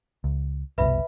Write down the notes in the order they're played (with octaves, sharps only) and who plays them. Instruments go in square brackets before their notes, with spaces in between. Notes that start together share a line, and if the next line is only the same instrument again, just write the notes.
[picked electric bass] C#2
[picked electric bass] F#1 C2 B2 [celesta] B4 E5 B5